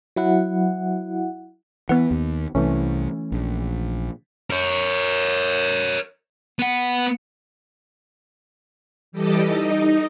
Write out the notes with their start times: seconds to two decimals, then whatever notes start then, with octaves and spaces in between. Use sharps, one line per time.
0.16 F#3 E4 F#5
1.89 E3 B3 B4 F#5
2.11 D#2
2.55 C2 E3 A3 C#4
3.32 A#1
4.50 A#4 C#5
6.59 B3 F#5
9.12 E3 G3 G4 A4 D#5 D6
9.47 D#4 D#5